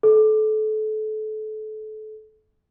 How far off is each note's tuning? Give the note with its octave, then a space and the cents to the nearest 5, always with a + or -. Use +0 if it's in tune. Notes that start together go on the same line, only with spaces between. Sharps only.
A4 -30